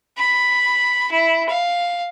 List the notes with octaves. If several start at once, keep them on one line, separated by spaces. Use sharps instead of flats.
B5
E4
F5